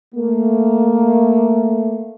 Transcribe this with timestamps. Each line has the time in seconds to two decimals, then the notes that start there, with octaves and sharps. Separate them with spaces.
0.15 A3 A#3